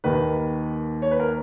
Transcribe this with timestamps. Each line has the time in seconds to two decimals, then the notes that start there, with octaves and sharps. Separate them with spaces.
0.04 D#2 D#3 A#3 B4
1.02 C#5
1.11 B4
1.20 A#4